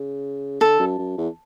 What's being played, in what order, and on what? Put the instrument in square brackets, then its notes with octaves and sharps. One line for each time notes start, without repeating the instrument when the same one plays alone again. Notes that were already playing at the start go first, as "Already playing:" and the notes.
Already playing: [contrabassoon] C#3
[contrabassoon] D3 [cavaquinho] A4
[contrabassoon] F#2
F#2
E2